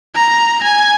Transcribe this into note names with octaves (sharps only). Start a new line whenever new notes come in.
A#5
G#5